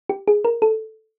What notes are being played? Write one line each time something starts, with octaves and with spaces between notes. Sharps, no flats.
G4
G#4
A#4
A4